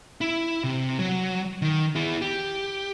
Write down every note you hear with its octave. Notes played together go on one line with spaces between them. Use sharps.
E4
C3
F#3
D#3
E4 G#4
G4